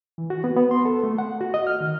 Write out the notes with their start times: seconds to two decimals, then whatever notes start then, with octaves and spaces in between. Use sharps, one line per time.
0.18 E3
0.30 F#4
0.44 B3
0.57 B3
0.71 C6
0.86 A4
1.04 A3
1.18 F#5
1.41 F#4
1.54 D#5
1.67 F6
1.81 D#3